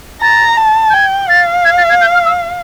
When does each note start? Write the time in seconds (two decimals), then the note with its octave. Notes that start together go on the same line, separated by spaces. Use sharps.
0.22 A#5 A6
0.57 A5
0.90 G6
0.94 G5 G#6
1.29 F5 A6
1.65 G#6
1.78 A6
1.90 G#6
2.01 G6
2.14 F6
2.25 E6